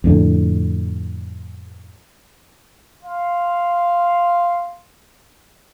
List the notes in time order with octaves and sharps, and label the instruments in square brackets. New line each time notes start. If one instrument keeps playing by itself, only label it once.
[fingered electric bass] F2 A2 D3
[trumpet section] F5 C6